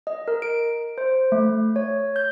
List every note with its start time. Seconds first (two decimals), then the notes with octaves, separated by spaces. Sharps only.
0.07 D#5
0.28 A#4
0.42 D7
0.98 C5
1.32 A3
1.76 C#5
2.16 G6